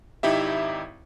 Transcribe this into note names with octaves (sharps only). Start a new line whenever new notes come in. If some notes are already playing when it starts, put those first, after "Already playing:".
G#1 D#4 E4 G4 E5